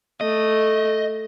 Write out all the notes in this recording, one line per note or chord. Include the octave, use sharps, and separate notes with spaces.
A3 D#5